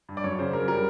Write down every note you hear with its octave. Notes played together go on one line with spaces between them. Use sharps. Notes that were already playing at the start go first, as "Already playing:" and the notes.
G2
D5
F#2 C#5
C#3 C5
F#2 A#4
G3 A#4